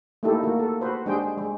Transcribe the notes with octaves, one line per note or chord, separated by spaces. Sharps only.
A3 A#3 D#4 E4 G4 A4
A#3 F#4
A4
F#4 B4 C5
G#3 D4 G4 G#4 C5 G5
G#3